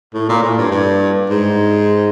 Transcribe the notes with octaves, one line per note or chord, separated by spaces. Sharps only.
A2
A#2
A2
G2
G2
G#2